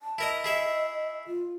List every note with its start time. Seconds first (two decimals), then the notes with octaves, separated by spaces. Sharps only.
0.01 A5
0.18 E4 A#4 D#5
0.44 E4 G#4 D#5 E5
1.27 F4